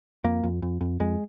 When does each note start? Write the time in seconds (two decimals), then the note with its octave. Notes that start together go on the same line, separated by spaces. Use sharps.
0.24 F2 A#3
0.43 F2
0.62 F2
0.81 F2
1.00 F2 G#3